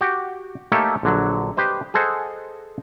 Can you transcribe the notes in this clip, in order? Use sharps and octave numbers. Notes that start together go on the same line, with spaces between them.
F#4 G4 F#5 G5
A3 A#3 D#4 G4 A4 C#5
A#1 D3 F#3
G4 B4 C5 D#5
G#4 A4 C5 D#5 F#5